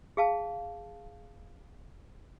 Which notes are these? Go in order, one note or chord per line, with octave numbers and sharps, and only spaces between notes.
G#4 F5 A5